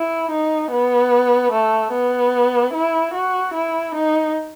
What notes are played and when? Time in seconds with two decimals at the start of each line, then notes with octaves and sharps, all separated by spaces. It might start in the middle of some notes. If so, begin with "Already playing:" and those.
Already playing: E4
0.31 D#4
0.71 B3
1.52 A3
1.93 B3
2.74 E4
3.14 F#4
3.54 E4
3.95 D#4